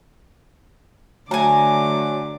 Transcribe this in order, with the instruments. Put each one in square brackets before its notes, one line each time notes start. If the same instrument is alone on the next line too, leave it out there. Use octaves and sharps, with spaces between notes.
[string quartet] D3 D6 [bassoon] F#3 [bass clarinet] A3 [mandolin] G#5 A#5